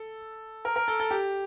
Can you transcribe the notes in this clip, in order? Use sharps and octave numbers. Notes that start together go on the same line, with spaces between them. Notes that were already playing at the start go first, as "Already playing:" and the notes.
Already playing: A4
A#4
A#4
A4
A4
G4